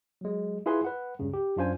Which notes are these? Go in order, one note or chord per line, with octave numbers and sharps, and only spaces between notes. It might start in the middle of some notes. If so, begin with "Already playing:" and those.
F#3 G#3
E4 F4 G#4 B4 G#5 C6
B4 F#5
C#2 G2 C#3
G4
F#2 D4 F4 C5 G#5